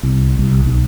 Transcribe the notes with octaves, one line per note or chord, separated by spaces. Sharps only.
C2
C2
B1